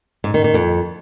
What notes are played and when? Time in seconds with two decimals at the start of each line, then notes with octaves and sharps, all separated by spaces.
0.24 G#2
0.34 D#3
0.44 D#3
0.54 F2